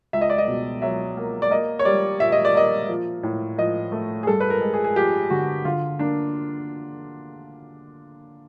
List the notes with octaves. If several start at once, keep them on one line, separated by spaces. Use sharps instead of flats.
C#2 E5
D#5
D5
D#5
B2
F#3 E5
A#3
D5
A#3 D#5
C#5
G3 D5
A#2 E5
D#5
D5
A#3 D#5
F3
A2
F3 D#5
A3
G#4
G2 A4
B4
A#4
G#3
G#4
G#4
F3 G4
D3 F#4
D3 F4
A#3 D4